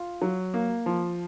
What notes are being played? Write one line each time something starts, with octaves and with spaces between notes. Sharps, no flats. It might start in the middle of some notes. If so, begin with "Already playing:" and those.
Already playing: F4
F#3
A#3
F3